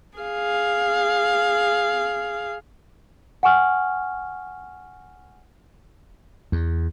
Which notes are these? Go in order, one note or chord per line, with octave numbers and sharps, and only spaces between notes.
G#4 F5
F#5 G#5 C#6 F6
E2